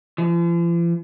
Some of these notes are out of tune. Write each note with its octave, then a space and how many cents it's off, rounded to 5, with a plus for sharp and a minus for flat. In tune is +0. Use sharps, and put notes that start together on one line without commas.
F3 -45